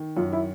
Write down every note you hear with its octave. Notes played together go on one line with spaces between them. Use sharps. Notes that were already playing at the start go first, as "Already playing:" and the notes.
Already playing: D#3
F#2 F4
E4